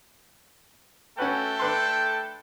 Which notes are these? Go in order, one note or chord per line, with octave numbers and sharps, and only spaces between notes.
A3 C#4 F#4 A4 B4 G5
D4 B4 C6